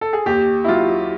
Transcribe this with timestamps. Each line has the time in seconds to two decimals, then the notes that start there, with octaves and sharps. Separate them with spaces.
0.01 A4
0.13 G#4
0.26 D#2 G4
0.64 E4
0.68 F#3 F4